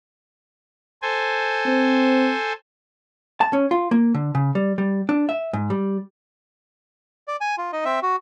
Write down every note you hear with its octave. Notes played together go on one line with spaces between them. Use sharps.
A4 C5 G#5
C4
A5
C#4
F4
A#3
D3
C#3
G3
G3
D4
E5
G#2
G3
D5
G#5
F4
D#4 D#5
C4 E5
F#4